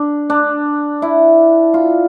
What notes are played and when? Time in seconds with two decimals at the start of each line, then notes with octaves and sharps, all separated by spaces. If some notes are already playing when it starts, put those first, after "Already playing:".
Already playing: D4
0.30 D4
1.02 E4
1.74 F4